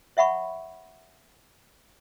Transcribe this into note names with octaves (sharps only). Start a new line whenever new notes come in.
C#5 E5 F#5 B5 C#6